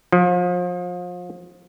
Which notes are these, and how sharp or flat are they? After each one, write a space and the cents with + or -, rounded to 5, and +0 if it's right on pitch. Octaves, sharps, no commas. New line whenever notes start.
F3 +30